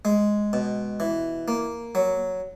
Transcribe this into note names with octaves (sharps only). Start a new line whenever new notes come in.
G#3
B2
E3
A#3
F#3